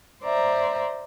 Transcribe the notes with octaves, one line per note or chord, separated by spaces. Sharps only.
C5 D5 E5 A#5